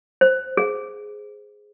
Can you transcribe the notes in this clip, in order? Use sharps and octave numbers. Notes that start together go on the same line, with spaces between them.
C5
G#4